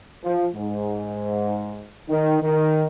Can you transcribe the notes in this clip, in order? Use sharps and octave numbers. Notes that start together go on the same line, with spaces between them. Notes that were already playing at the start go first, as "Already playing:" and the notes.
F3
G#2
D#3
D#3